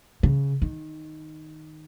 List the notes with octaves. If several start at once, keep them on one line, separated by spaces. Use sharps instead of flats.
C#3
D#3